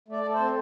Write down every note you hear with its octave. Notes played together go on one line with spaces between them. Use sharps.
A3 D5
A3
C4 C5